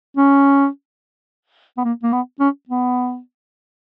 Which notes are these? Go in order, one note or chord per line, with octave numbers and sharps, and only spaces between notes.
C#4
B3
A#3
A#3
B3
C#4
B3